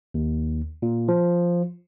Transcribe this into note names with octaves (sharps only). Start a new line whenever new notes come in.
D#2
A#2
F3